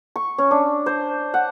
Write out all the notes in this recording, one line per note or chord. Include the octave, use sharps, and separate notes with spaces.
C#6
C#4
D4
C5
F#5